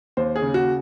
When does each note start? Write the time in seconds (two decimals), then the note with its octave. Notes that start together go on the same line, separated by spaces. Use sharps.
0.17 D#2 C5
0.36 G#4
0.42 C#3
0.54 F#4